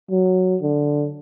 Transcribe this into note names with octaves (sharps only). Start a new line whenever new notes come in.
F#3
D3